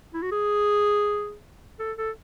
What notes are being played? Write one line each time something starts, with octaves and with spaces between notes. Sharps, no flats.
E4
F#4
G#4
A4
A4